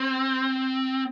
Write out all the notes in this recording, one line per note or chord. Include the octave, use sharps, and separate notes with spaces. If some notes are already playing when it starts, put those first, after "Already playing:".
Already playing: C4